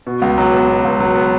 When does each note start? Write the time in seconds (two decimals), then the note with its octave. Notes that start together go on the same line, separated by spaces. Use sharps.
0.07 B2
0.22 C#2
0.38 F#3
0.53 B3
0.69 B2
0.85 C#2
1.00 F#3
1.16 B3